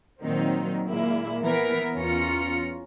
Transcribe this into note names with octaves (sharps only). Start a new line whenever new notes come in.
A#2 D#3 F#3 C4 D#4
A#2 G#3 A#3 E4
E3 B3 A#4 B6
E2 C#4 F4 A#5 C#7